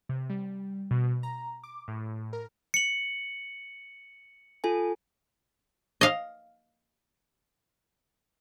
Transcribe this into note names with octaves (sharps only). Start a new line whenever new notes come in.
C3
G3
B2
A#5
D6
A2
A#4
C#7 F#7
F4 A4 G#5
D#5 F5